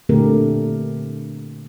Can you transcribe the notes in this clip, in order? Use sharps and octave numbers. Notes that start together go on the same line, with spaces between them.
A#2 D3 A3 C4 G4 A#4